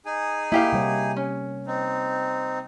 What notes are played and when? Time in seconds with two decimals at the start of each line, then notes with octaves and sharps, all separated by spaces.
0.06 D#4 G#4 G#5
0.52 A#3 E4 G4 F5
0.72 C3 G3 C#5
1.16 C#4
1.67 C4 D#4